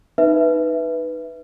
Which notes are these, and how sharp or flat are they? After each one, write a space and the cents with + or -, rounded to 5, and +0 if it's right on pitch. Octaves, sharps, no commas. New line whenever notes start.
D#4 +0 B4 +0 E5 +0